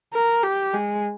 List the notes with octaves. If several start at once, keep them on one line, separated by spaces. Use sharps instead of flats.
A#4
G4
G#3